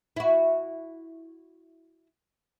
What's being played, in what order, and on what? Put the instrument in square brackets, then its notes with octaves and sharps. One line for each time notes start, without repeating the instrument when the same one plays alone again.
[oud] E4 F#4